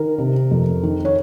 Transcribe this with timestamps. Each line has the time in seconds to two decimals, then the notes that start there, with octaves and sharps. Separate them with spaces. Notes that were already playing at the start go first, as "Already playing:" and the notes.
Already playing: D#3 A#4
0.18 C3
0.51 F2
0.83 D#3
1.05 C#5